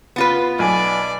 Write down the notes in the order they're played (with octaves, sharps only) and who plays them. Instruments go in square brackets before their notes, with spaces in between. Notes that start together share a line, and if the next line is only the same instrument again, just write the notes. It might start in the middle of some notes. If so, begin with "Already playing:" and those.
[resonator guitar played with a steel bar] B3 F4 B4
[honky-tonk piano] B1 G#5 [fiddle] D5